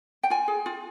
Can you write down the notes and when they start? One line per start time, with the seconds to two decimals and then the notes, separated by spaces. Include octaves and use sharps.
0.23 G5
0.30 F4 G#5
0.48 G#4
0.66 F4